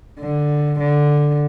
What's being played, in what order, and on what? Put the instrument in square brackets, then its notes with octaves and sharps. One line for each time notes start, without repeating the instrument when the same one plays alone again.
[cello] D3
D3